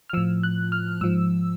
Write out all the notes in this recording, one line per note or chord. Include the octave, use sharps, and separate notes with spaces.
F6
A2 F3 E6
F#6
F6
G#2 F3 E6